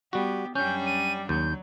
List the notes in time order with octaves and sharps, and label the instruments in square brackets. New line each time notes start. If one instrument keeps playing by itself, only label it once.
[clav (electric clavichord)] G3 F#4 [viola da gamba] B3 G4
[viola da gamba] F#2 G3 D4 [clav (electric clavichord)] C#4 [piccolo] G6
[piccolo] D#7
[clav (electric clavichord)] D#2 [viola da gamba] F#3 [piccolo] G6